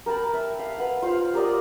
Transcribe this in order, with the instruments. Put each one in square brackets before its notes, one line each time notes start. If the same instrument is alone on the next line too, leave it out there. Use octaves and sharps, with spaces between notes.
[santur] A#4 G5 A5 B5
E5
F5
B4 F#5
F4 C5 F5
G4 A#4 D5 D#5